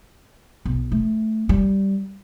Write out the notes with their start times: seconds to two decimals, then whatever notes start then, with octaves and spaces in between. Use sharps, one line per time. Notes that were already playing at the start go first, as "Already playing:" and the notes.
0.65 B1
0.92 A3
1.49 G3